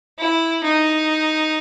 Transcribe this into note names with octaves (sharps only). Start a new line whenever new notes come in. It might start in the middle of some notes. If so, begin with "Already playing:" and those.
E4
D#4